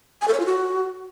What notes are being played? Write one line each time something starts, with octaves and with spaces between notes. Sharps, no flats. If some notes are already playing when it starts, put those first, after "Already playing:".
G#5
A4
C#5
F4
F#4